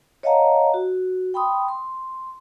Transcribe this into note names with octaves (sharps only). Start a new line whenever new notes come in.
C#5 D#5 F5 F#5 A5 A#5
F#4
G5 B5 C6 D#6
C6